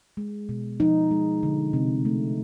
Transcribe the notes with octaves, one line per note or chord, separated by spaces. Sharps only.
G#3
B2
F3 D#4
G#3
D3
C3
A3